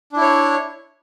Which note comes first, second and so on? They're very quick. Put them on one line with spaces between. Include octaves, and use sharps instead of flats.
D4 E4 C#5